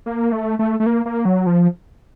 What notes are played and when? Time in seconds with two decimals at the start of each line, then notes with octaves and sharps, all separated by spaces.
0.06 A#3
0.32 A3
0.59 A3
0.80 A3
0.86 A#3
1.06 A#3
1.25 F#3
1.46 F3